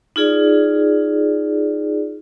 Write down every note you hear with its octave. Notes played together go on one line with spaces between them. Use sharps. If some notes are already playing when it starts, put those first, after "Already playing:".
D#4 F4 G#4 D5